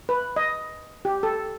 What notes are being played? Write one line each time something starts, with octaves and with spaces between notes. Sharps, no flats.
B4
D#5
G4
A4